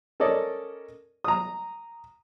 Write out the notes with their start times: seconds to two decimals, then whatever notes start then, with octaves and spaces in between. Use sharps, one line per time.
0.20 C#4 A4 A#4 D5 D#5
1.24 A#5 D#6